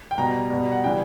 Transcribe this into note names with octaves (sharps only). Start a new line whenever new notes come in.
G5
B2 G3 A#5
B2 G3
F#5
C#3 E3 G3 G5